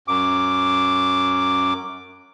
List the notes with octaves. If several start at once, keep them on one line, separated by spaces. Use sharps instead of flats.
F#2 D6